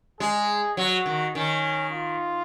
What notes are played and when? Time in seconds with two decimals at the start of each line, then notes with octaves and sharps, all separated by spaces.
0.20 G#3 G#4
0.77 F#3 F#4
1.06 D#3
1.35 D#3 C#4
1.92 F4